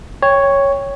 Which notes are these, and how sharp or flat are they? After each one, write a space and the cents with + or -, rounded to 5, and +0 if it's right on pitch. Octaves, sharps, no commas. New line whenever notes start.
C#5 +0 G5 +15